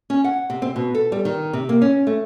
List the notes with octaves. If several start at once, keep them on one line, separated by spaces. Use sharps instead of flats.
C#4
F#5
C3
C4
B2
A4
G3
D#3
C3
A#3
C#4
A3